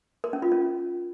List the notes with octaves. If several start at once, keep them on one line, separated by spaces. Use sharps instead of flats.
A#4
C#4
F4
C#4